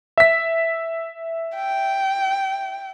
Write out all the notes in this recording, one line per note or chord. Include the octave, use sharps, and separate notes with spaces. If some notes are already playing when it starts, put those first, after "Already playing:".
E5 B6
G5